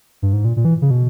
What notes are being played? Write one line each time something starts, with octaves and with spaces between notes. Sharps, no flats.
G2
G#2
A#2
A#2
E3
C#3
B2